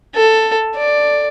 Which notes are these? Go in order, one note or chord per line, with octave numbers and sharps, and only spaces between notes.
A4
D5